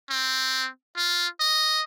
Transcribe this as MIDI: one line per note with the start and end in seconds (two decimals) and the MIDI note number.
0.10 0.68 60
0.97 1.27 65
1.40 1.84 75